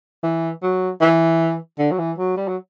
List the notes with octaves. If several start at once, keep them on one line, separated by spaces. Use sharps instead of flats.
E3
F#3
E3
D3
F#3
E3
F#3
G3
F#3